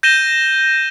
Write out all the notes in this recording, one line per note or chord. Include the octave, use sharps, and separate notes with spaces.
G6 A#6 D#7 E7 G7